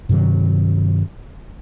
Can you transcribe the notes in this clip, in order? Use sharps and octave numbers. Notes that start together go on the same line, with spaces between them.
G2 C3 D#3 F#3